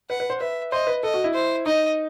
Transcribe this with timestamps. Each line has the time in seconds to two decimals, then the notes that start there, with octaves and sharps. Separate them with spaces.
0.10 B4 F#5
0.20 B4
0.30 C5
0.40 B4 E5
0.72 C5 D#5
0.87 B4
1.03 A4 D#5
1.14 F#4
1.24 E4
1.34 C5
1.66 D#4 D#5